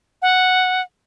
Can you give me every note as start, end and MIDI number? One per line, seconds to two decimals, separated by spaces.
0.22 0.81 78